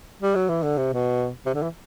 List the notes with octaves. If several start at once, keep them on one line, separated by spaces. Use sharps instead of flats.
G3
F#3
E3
D3
C3
B2
C3
D3
E3